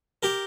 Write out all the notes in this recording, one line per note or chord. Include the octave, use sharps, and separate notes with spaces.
G4 A#4